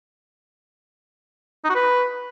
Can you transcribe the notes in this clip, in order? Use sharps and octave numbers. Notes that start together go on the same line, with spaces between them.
D#4
F#4
B4